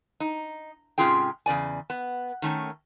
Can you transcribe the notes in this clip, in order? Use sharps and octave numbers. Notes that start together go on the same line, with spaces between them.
D#4
G#2 C3 C#4 F4 G#4 G5
E2 C#3 D5 G#5
B3
D#3 A3 C#4